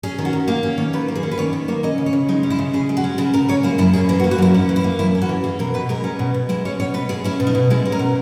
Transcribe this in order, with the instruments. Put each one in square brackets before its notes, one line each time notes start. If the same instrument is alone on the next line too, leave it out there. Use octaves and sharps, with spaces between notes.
[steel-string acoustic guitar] C#4 G#4
D#3
F#4
D#3
A#3 G#4
C#4
D#3 C#5
D#3 B4
A#3
G#4
C#4
B4
D#3 C#5
D#3
A#3 C#5
C#4 D#5
C#3
C#5
C#3
G#3 D#4
C#4
E4
C#3
C#3 G#4
G#3
F#4
C#4
C#3 E4
C#3 A#4
G#3 C#5
A#3 E4
F#2 E4
C#4 G#4
E3 E4
F#4
A#3
F#4
F#2 E4
C#4 D#4
E3
E4
A#3
F#2 E4
C#4
F#4
E3
C#4 G#4
B2 A#4
B2 B4
G#3 A#4
C#4
B2
B2
G#3 E4
C#4 C#5
B2 C#5
B2 B4
G#3 G#4
C#4 E4
B2
D#4
B2
G#3 E4
C#4
A#4
B2